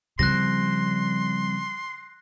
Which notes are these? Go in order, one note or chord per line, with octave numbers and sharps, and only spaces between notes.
C#3 F3 G3 C4 C6 F#6 A#6